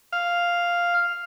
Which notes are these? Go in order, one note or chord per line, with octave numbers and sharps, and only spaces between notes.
F5